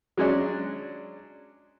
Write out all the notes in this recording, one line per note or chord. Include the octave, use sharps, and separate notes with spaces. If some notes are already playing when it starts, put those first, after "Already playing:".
F#3 G#3 C#4 D4